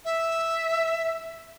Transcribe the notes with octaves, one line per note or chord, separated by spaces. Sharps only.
E5